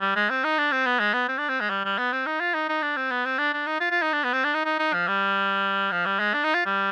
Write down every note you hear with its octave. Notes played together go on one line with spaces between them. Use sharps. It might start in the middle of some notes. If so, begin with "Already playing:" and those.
G3
G#3
C4
D#4
D4
C4
B3
G#3
B3
C4
D4
C4
G#3
G3
G3
B3
C4
D#4
F4
D#4
D#4
D4
C4
B3
C4
D4
D4
D#4
F4
F4
D#4
D4
B3
C4
D4
D#4
D#4
D#4
F3
G3
F3
G3
G#3
D4
D#4
F4
G3